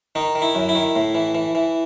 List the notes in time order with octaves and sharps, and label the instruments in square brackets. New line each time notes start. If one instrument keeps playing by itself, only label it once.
[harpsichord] D#3 D#4
D#3
E4
F#2
E4
D#3
A2
E3
E3
E3